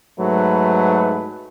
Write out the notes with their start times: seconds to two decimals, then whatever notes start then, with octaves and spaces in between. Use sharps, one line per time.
0.20 G#2 F#3 A3 B4